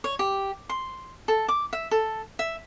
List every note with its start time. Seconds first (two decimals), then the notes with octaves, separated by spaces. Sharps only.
0.04 C#5
0.19 G4
0.69 C6
1.28 A4
1.48 D6
1.73 E5
1.91 A4
2.39 E5